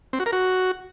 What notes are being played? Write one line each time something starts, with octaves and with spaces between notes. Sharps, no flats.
C4
F#4
A#4
F#4